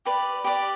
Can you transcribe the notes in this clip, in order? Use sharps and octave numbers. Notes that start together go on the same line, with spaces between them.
G4 B4 D5
G4 B4 D5